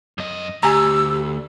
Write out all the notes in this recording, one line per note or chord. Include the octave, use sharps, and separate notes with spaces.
F#2 D#5
D2 G4 G#5 A#5 E6